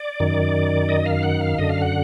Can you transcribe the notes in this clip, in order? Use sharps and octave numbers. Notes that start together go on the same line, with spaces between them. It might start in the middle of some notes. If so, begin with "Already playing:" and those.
Already playing: D5
F#2 D#3
D#5
F5
F#5
F5
F#2 D3 D#5
F5
F#5